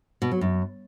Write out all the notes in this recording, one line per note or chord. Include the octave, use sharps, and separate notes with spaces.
B2
F#3
F#2